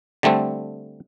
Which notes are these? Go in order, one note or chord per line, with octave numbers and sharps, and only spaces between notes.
D3 G3 A3 C4